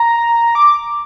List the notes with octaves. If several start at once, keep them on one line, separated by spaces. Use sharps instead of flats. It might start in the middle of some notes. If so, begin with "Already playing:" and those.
Already playing: A#5
D6